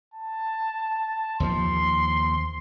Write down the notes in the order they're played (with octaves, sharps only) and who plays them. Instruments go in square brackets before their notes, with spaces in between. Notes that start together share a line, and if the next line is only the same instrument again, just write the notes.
[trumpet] A5
[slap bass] D#2 F3 [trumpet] C6